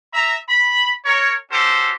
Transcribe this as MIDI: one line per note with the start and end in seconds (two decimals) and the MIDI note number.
0.14 0.36 76
0.14 0.36 82
0.49 0.91 83
1.05 1.34 70
1.05 1.34 73
1.51 1.91 61
1.51 1.91 66
1.51 1.91 67
1.51 1.91 69
1.51 1.91 72